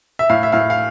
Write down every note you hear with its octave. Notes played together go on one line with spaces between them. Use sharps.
E5
A2 F5
E5
A2 F5
F5